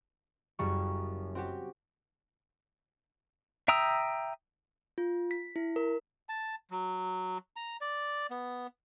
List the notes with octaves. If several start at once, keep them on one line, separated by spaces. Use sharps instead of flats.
F#1 F#2 G3 C#6
C4 F#4 G4
E5 G5 A#5 D#6 E6
F4
B6
E4
A#4
A5
F#3
A#5
D5
B3